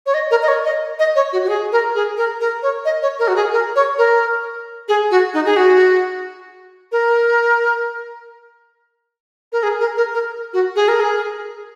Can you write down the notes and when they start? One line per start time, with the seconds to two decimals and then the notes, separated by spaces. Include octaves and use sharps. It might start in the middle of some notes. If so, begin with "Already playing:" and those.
0.06 C#5
0.14 D#5
0.31 A#4
0.43 D#5
0.48 C#5
0.65 D#5
0.99 D#5
1.16 C#5
1.33 F#4
1.44 F#4
1.49 G#4
1.72 A#4
1.95 G#4
2.18 A#4
2.41 A#4
2.63 C#5
2.85 D#5
3.02 C#5
3.19 A#4
3.28 F#4
3.36 G#4
3.53 A#4
3.76 C#5
3.98 A#4
4.88 G#4
5.11 F#4
5.34 D#4
5.46 G#4
5.57 F#4
6.92 A#4
9.52 A#4
9.63 G#4
9.80 A#4
9.97 A#4
10.14 A#4
10.53 F#4
10.76 G#4
10.88 A#4
11.00 G#4